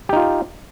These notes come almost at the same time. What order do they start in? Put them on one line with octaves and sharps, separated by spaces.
G4 D#4 F4